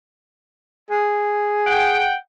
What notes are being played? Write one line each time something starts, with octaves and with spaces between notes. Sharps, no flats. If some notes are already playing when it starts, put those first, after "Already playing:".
G#4
F#5 G5